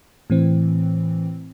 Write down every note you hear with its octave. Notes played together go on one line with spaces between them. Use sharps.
A2 E3 C4